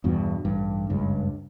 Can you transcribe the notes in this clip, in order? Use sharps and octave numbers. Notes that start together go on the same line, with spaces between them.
E2 G2 B2
A1 G2
F#1 C#2 G2